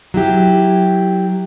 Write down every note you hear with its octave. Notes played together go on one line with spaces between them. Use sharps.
F#3 E4 G4